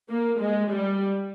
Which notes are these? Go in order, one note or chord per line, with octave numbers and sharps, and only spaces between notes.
A#3
G#3
G3